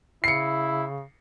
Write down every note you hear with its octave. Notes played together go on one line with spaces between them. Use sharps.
C#3 E4 C7 C#7